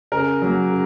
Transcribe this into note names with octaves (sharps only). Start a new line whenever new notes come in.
C#3 A#4
F#3 A#3
C#3